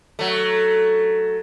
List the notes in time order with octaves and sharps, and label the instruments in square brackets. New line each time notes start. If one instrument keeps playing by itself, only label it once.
[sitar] F#3 A3